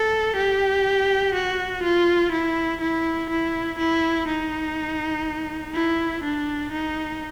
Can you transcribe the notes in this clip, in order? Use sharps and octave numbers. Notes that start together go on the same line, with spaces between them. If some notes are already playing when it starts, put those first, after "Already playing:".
Already playing: A4
G4
F#4
F4
E4
E4
E4
E4
D#4
E4
D4
D#4